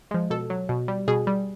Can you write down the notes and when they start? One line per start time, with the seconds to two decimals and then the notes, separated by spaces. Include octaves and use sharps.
0.11 F3 G#3
0.30 B2 A4
0.50 F#3
0.69 B2
0.88 G3
1.08 B2 G#4
1.27 G3